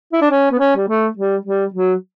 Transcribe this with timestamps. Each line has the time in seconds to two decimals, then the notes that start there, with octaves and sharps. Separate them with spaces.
0.12 E4
0.21 D4
0.30 C#4
0.51 B3
0.59 C#4
0.76 G3
0.88 A3
1.17 G3
1.45 G3
1.74 F#3